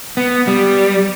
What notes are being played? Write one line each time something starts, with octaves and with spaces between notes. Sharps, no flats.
B3
G3